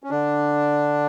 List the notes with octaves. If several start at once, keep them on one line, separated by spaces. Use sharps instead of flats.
C#4
D3 D4